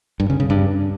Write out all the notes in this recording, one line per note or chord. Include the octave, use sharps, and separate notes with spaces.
G2
C#3
C#3
G2